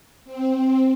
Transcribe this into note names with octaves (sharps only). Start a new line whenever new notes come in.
C4